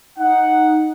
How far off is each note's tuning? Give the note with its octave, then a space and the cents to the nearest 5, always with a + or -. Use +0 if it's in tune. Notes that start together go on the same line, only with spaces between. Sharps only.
D#4 +0 F#5 +0